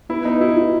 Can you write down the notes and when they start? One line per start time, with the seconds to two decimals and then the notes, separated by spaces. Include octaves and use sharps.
0.09 B3 E4
0.25 B3 D#4
0.41 E4 F#4
0.57 F#4